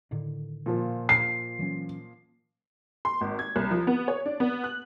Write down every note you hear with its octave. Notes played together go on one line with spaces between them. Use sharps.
A2 D3 D#3
A#2 F3
C7
E3 F#3 C#4
C6
G#1
G#6
C2
F3
B3
C#5
D4
B3
F#6